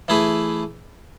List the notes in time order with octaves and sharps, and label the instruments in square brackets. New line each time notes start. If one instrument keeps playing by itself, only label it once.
[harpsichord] E3 A3 E4 G#4 B4